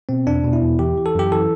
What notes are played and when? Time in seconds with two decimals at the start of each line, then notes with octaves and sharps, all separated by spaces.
0.09 B2 C4
0.27 E2 D4
0.44 B2
0.53 E4
0.62 E2
0.79 E3 G4
0.97 E3
1.06 A4
1.15 F#2 G4
1.32 E3 A4